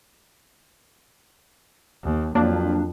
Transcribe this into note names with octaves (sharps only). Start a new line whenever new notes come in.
D#2
F2 F#3 A#3 D4